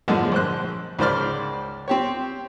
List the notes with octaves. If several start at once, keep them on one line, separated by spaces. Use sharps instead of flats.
F#2 A2 D3 F3 G#3 D4
A#1 C5 F#6
C#2 G#2 C5 D5 F6
C4 G4 C#5